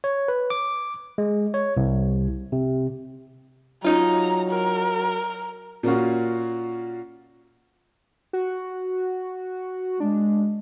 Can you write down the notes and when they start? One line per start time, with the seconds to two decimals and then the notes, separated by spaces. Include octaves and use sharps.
0.04 C#5
0.28 B4
0.50 D6
1.18 G#3
1.54 C#5
1.77 C2
2.52 C3
3.84 F#3 C#4 D#4 F4 A#5
4.51 A#4
5.83 A#2 A#3 C#4 F4 F#4
8.33 F#4
10.00 G#3 D4